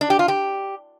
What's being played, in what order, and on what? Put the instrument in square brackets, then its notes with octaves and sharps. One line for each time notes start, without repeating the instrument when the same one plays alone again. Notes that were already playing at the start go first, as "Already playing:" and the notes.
[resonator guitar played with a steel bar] D4
G4
F4
G4